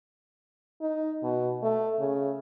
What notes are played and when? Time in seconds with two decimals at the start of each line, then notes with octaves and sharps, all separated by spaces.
0.81 D#4
1.23 B2
1.62 A3
1.99 C#3